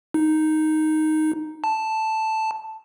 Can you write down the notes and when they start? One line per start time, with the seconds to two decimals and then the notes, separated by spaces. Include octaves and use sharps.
0.14 D#4
1.64 A5